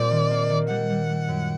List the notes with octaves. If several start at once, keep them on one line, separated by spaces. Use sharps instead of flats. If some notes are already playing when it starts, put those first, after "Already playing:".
Already playing: A#2 G3 C4 D5
D#3
A#3
D#3
G3 F#5
G3
G3
F#2